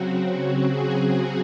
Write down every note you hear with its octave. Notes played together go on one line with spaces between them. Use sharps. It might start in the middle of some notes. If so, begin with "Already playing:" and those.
Already playing: C#3 F#3 C4 F#4
F#4
G#4